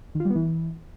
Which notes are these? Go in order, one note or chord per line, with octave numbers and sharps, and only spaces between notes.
D#3
F4
G3
B3
E3